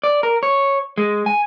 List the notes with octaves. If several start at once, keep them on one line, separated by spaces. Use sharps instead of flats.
D5
A#4
C#5
G#3
G#5